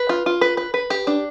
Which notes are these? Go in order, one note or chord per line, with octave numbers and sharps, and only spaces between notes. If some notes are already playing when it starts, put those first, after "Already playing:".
Already playing: B4
F4
F4
B4
B4
B4
G4
D4